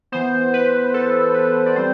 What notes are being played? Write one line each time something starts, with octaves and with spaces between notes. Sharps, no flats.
E3 B3 C5
B4
A4
B4
D5
G3 C4 C5